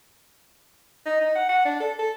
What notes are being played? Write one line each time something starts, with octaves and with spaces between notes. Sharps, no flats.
D#4
D#4
F#5
F#5
D4
A4
A4